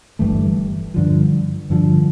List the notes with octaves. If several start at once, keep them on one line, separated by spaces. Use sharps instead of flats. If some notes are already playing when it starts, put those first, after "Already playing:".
G1 G2 E3 A3
G2 D3 F3
G2 D3 F3